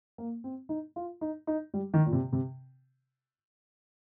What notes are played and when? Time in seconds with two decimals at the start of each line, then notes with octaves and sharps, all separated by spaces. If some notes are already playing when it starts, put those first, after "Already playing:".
0.18 A#3
0.44 C4
0.69 D#4
0.96 F4
1.21 D#4
1.47 D#4
1.74 G3
1.94 D#3
2.06 A#2
2.12 C3
2.33 C3